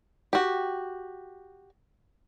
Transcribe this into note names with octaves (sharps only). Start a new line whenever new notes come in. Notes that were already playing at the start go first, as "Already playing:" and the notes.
F#4 G4